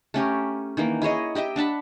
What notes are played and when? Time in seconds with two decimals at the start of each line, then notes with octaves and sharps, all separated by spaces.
0.14 A3 C#4 G4 A#4
0.77 D#3 E3 A#3
1.02 E4 G#4 C#5 D#5
1.35 G4 D#5 E5 G5
1.56 D4 F#5 A5 B5